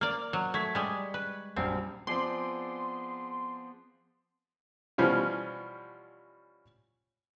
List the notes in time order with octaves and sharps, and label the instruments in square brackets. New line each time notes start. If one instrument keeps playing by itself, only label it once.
[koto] A#3 D5 [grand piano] F6
[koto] F#3
[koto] A3 [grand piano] C#6 G#6 B6
[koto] G3 G#3
B4
[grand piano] A#1 F#2 G3 [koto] C4
[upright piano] F3 C4 [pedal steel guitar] B3 G#4 D5 [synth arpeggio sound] C6
[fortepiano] B2 E3 F3 G3 C#4 F4